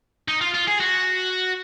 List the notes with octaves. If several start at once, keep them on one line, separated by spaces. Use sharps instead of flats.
D#4
F4
F4
G#4
F#4